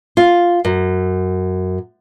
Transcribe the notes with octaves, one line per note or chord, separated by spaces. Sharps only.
F4
F#2